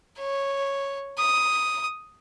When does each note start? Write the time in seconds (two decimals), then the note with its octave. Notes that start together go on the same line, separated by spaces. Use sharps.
0.18 C#5
1.18 D#6